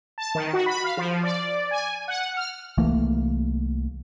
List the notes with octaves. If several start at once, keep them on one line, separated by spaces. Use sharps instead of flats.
A5
D#3
F#4
B5
F5
F3
D5
G#5
F#5
F6
C2 E3 A3 A#3